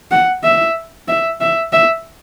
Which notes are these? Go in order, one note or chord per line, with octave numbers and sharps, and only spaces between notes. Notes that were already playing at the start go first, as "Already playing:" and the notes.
F#5
E5
E5
E5
E5